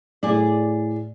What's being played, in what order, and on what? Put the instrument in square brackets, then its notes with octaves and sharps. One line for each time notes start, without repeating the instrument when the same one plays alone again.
[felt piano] A2 [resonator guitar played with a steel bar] G#4 D5